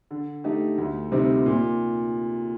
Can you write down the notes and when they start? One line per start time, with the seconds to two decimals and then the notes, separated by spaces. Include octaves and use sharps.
0.11 D3
0.44 A3 D#4 G4
0.78 D2
1.12 C3 G3 C4 D#4
1.46 A#2